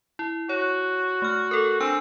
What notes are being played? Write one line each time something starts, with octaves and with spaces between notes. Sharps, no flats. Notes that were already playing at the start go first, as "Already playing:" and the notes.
E4
F#4 C#5
A3 F6
A4 A#4
C4 D4 G#5 E6